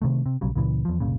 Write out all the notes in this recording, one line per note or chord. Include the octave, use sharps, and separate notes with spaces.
C3 D#3 A3
C3
B1 C#3 F#3 G3
C#2 A#2 C#3 E3
E2 F3
F#1 C2 A#2 C#3